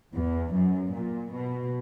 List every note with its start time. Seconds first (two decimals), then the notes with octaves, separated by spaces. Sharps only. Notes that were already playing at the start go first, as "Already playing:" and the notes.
0.14 E2
0.55 F#2
0.94 A#2
1.33 B2